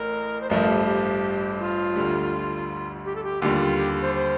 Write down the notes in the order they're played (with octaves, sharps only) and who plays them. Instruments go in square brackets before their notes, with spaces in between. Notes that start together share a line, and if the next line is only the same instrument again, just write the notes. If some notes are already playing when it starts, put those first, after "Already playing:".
Already playing: [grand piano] A1 A2 [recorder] A#4
[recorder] C5
[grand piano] A1 G2 F3 A3 [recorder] A#4
[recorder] G4
G4
F4
[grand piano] D2 D3 G3
[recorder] G4
A4
G4
[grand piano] D#2 D3 G3 [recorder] F4 G4
[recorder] G4
C5
C5